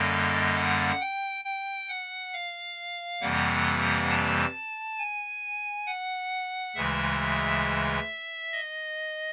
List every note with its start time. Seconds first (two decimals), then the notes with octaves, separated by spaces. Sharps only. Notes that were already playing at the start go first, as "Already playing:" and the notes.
Already playing: F#2 D3 G3 A#3 D#5
0.56 F#5
1.01 G5
1.44 G5
1.89 F#5
2.33 F5
3.21 F2 C3 E3 G3 A#3 F#5
4.10 A5
4.98 G#5
5.87 F#5
6.75 D2 C#3 E3 G#3 E5
8.52 D#5